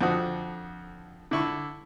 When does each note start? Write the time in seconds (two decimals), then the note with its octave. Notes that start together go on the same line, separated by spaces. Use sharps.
0.01 F2 D3 F3 F#4 D#6
1.31 D3 E4 C#6